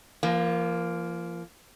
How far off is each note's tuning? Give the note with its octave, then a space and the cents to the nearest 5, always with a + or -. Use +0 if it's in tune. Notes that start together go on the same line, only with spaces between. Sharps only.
F3 -35 A#3 +0